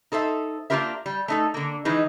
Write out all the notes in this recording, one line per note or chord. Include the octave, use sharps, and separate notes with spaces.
D#4 A4 C5 E5
A#3 D4 F4 G4 A#4 E5
G3
A3 D#4 A4
D3 A#3
D#3 E3 G#3 D#4